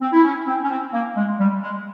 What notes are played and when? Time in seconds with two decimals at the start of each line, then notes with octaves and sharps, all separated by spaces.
0.01 C4
0.12 E4
0.24 C#4
0.46 C4
0.63 C#4
0.69 C4
0.93 A#3
1.16 G#3
1.39 G3
1.62 G#3